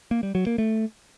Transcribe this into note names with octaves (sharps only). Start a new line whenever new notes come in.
A#3
G3
F#3
A#3
A3